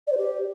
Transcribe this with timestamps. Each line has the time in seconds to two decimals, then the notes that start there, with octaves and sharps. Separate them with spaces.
0.07 D5
0.12 C5
0.17 G4